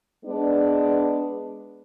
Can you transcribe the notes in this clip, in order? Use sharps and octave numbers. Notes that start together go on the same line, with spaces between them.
G#3 B3 D4